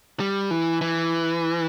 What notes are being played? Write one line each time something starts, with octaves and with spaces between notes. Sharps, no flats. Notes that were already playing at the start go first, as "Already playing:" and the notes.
G3
E3
E3